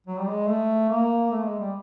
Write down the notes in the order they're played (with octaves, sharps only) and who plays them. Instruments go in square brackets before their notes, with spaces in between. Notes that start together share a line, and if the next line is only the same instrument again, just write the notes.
[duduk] F#3
G3
G#3
A3
A#3
A3
G#3
G3